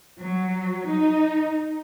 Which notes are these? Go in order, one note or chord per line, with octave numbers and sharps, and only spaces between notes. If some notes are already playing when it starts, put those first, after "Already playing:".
F#3
D#4